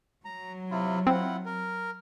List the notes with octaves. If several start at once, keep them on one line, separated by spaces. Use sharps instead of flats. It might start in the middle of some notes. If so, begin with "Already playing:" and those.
F#3 A#5
C3 E4 F4
C4 E4 F4 F#5
A#4